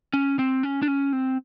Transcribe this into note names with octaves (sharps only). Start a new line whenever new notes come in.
C#4
C4
C#4
D4
C#4
C4